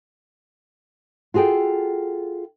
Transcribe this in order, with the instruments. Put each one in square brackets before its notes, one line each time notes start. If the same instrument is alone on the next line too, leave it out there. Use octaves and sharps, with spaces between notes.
[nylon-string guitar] F4 F#4 G#4 A4 G5